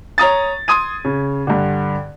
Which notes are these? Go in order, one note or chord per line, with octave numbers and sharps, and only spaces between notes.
C#5 A#5 D#6 A6
C6 D#6 G#6 D#7
C#3
G2 D3